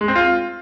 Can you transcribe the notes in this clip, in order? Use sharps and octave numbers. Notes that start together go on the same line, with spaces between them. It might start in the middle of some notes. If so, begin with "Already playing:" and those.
G#3
C4
F4